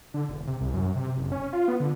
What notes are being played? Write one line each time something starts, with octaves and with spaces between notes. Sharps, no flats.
D3
E1
C3
C2
F#2
C3
F#1
C#4
F4
B3
D3